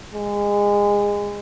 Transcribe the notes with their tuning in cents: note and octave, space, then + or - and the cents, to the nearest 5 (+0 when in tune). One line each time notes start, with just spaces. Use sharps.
G#3 -25